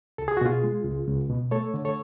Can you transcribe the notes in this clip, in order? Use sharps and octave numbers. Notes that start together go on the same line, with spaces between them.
C#2 A4
G#4
F#4
B2 F4 G#4
G#3
C#2
C#2
B2
A3 A4 C#5
D3
A4 C#5